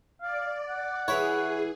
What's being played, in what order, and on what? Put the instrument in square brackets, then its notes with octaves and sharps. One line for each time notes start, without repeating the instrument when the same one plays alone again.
[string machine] D5 [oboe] F5
[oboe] F#5
[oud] E3 E4 [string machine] G#4 [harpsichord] C#5 B5